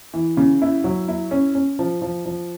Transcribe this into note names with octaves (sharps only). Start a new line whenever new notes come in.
E3
C#3
E4
F#3
E4
C#4
C#4
F3
F3
F3